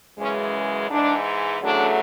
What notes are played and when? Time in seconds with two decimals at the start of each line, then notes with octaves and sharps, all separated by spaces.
0.19 F#2 C#3 E3 G#3 C#4
0.90 G#2 E3 G#3 D4
1.62 E2 C#3 F#3 A3 D4